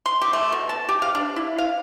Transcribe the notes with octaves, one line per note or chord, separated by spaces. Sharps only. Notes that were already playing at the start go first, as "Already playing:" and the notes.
C6
G4
A3
B2
A5
G4
F5
D4
E4
F5